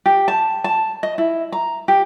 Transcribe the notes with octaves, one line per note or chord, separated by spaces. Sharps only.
G4
A5
A5
D#5
E4
A#5
G4